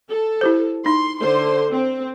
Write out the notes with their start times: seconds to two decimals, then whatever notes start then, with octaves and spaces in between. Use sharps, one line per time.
0.11 A4
0.41 E4 G4 C5
0.86 D#4 C6
1.20 D3 C5 C6
1.71 C4